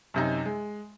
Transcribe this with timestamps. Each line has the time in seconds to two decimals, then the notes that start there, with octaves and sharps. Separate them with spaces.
0.14 F#2 C3 D#4
0.45 G#3